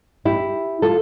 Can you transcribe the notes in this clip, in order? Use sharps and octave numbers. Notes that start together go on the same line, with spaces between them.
E4 G4
F4 A4